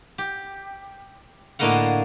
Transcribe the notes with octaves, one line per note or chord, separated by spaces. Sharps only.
G4
A2 D3 A#3 D#5 F5 F#5